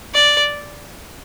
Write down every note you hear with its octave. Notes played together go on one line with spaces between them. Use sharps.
D5